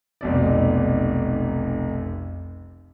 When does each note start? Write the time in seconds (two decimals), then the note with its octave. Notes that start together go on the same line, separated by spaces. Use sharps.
0.21 F1 B1 D5